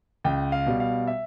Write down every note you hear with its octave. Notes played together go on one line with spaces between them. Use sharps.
C#2 G5
F5
B2 G3
F5
E5